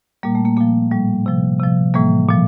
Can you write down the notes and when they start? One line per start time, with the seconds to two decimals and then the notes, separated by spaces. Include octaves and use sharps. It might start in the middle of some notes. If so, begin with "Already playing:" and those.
0.23 A#2 G3 A#3
0.35 A3
0.45 A#3
0.57 A#2 F3 A#3
0.92 A2 G3
1.26 C3 F3
1.59 C3 F3
1.94 A2 E3 G3 A#3
2.29 A#2 F3